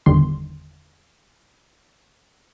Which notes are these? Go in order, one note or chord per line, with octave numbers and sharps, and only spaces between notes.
G1 E2 D3 D#3 G3 C6